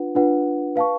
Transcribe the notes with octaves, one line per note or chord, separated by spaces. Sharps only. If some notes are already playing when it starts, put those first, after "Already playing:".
Already playing: D4 F4 B4 F#5
D4 F4 B4 F#5
B4 F5 A5 C#6